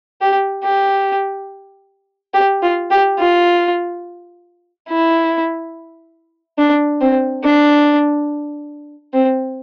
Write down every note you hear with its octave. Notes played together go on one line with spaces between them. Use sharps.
G4
G4
G4
F4
G4
F4
E4
D4
C4
D4
C4